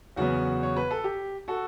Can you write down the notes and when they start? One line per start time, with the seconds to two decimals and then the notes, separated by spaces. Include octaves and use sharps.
0.16 E2 C#3 F#3 B3 F#4
0.63 C#5
0.76 B4
0.91 A4
1.04 G4
1.48 F#4 A4